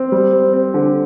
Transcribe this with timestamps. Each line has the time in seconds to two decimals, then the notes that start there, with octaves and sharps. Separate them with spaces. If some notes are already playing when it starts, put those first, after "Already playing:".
Already playing: C4
0.12 G3
0.33 C4
0.53 C4
0.74 D3